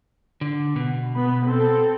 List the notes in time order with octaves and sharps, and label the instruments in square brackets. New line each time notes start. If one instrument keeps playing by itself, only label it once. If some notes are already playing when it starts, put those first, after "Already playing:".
[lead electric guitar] D3
B2
[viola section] B3 B5
C4 A4